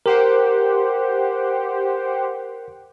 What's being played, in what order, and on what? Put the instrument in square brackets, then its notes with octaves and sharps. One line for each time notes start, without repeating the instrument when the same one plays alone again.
[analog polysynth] G4 C5 F#5 [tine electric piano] A#4